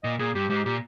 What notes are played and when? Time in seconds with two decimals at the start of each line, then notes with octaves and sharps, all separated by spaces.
0.03 A#2 D#5
0.19 A#2 G#4
0.35 G2 G4
0.50 G#2 G4
0.65 A#2 G4